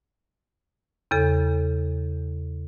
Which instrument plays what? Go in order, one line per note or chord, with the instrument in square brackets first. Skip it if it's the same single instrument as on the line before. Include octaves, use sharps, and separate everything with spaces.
[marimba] E2 C#3 A4